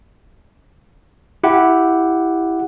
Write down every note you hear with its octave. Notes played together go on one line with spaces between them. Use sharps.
E4 G4 F#5